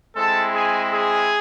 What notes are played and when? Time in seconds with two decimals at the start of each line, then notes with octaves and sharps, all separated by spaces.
0.16 G#3 C4 E4 A4 A5
0.53 G#4 G#5
0.92 G#4 G#5